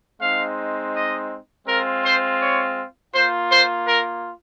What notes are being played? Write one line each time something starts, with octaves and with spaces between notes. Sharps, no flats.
G#3 C4 D#4 F5
D#5
G#3 C4 F4 A#4
C5
C#5
A#3 F4 C5
C5
A#4